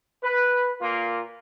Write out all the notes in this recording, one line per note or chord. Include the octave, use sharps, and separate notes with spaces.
B4
A#2 A#3 F4